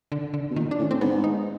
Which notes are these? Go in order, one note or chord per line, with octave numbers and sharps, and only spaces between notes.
D3
D3
B2
A#2 D#3
D4
A2
C#4
C4
G#2 B3
D#4